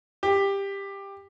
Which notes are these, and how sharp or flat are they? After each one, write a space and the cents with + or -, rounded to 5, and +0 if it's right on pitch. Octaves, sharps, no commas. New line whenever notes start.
G4 +15